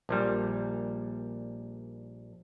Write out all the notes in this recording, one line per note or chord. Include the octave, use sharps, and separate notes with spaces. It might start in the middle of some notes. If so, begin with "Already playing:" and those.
A#1 A#2 G3